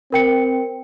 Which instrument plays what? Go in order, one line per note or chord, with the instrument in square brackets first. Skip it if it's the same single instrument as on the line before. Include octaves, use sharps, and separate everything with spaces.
[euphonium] C4 [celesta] A#4 G5 C#7